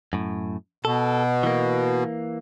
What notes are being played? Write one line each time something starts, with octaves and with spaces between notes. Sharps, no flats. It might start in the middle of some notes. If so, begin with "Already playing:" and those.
F#2 A2
B2 A4
E3 A#3